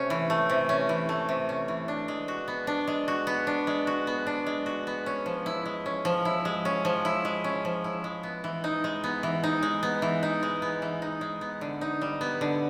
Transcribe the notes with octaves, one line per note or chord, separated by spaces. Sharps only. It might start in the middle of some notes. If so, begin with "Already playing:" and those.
Already playing: C3 A3 C#4
E3
A3
C3
C#4
E3
A3
C3
C#4
E3
D4
G#3
F#4
B3
D4
G#3
F#4
B3
D4
G#3
F#4
B3
D4
G#3
F#4
B3
C#4
F3
E4
G#3
C#4
F3
E4
G#3
C#4
F3
E4
G#3
C#4
F3
E4
G#3
B3
E3
D#4
G#3
B3
E3
D#4
G#3
B3
E3
D#4
G#3
B3
E3
D#4
G#3
B3
D3
D#4
G3
B3
D3